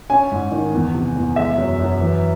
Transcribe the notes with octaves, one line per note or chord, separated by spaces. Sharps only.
C#4 G#5
G#2
D#3
E2
C3
E2
G#3 E5
F#2
F#2
E3